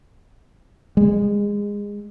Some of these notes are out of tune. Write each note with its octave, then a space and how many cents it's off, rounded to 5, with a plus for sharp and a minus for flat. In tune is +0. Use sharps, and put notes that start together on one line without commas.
G#3 -25